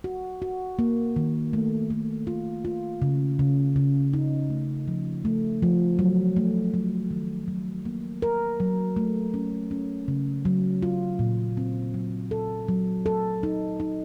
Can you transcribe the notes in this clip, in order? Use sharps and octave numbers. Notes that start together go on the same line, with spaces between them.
F#4
F#4
A#3
D#3
A3
A3
F4
F4
C#3
C#3
C#3
D#4
A3
F3
A3
F3
F#3
A3
F#3
D#3
F#3
A#3
A#4
F#3
A3
C#4
C#4
C#3
F#3
F4
A#2
C4
F#3
A4
F#3
A4
D#4
D#4